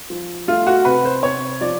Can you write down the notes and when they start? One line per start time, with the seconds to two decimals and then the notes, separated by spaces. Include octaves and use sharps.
0.10 F3
0.48 A3 F4
0.67 F#4
0.85 C3 B4
1.05 C5
1.23 C3 C#5
1.61 F3 D5